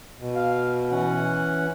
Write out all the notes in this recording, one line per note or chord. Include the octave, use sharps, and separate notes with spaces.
B2
F5
E3 C#4 F#5